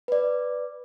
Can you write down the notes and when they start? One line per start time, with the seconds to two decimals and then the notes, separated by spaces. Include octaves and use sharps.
0.08 B4 D5